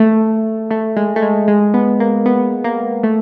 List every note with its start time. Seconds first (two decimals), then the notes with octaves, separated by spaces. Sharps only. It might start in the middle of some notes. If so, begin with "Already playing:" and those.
Already playing: A3
0.71 A3
0.97 G#3
1.16 A3
1.22 G#3
1.48 G#3
1.74 B3
2.00 A#3
2.26 B3
2.64 A#3
3.03 A3